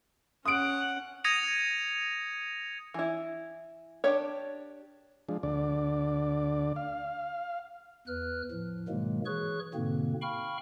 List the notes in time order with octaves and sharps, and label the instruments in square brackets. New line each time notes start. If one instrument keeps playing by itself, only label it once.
[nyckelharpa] C#4 F#5 [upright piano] D#6 D7
[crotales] D#6 G#6 A#6 C#7 D#7 F7
[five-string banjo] E3 E4
D4 G4 C#5
[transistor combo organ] F3 G#3 D4
D2 D3 D5
F5
[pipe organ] E2 B4 F6 F#6
A2 F3
G#2 B2 D#3 F#3 G#3 A#3
E3 G#4 C#5 C#6 F#6
G#2 B2 D3 A#3 C4
F5 G5 B5 C#6 F6